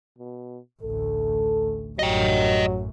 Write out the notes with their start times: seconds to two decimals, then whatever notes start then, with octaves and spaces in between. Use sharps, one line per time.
0.18 B2
0.82 A1 D2 A4
1.99 A1 F#2 F#3 G3 D#5 G5